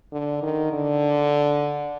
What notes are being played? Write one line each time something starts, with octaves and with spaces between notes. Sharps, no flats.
D3
D#3
D3